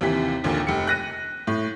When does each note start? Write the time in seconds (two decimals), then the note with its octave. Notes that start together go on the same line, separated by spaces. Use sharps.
0.01 D#2 C3 E3 B6
0.44 A#1 D#2 A#2 D3
0.67 F1 G4 C#7
0.87 F#6 A#6 D#7
1.47 A2